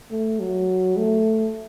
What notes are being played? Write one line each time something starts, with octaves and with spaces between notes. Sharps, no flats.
A3
F#3
A3